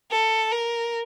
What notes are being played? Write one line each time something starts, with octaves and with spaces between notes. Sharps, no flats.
A4
A#4